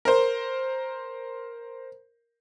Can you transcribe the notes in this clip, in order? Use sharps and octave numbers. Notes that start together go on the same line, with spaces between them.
A#4 C5